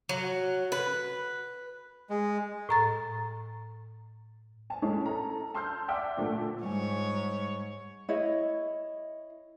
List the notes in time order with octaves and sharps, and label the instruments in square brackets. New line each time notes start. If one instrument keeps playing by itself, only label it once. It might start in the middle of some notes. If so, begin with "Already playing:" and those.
[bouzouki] F#3
B4
[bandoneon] G#3
[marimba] A2 A#5 A6
[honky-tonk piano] G#5 A5
G#3 C#4 D#4 E4 A4 C#5
A4 A#5
A5 C6 E6 F6 G6
D5 E5 F#5 G5 D6 E6
A#2 D3 A3
[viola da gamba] G#2 C#5 [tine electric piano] G3 G#5
[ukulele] E4 C#5 D#5